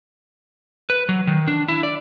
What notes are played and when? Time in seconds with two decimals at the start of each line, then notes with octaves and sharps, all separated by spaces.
0.90 B4
1.09 F#3
1.27 D#3
1.48 D4
1.68 E4
1.83 D5